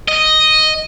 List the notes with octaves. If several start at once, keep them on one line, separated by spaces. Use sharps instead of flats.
D#5